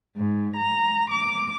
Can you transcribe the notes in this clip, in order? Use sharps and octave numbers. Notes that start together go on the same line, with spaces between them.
G#2
A#5
D6